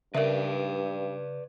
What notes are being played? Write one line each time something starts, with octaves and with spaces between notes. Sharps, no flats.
G2 C#3 A#4 B4 D5 E5